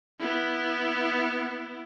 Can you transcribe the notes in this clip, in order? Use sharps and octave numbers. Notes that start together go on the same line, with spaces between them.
B3 E4